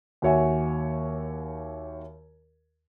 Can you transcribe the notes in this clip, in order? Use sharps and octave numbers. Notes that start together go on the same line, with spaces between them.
D#2 F#4 C#5 E5 G#5